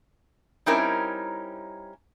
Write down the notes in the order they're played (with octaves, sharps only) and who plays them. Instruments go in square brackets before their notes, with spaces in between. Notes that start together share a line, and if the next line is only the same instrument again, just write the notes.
[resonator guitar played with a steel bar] G3 C4 C#4 D#4 E4 A#4